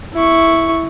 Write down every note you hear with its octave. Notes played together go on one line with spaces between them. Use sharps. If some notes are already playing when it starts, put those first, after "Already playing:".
E4 C#6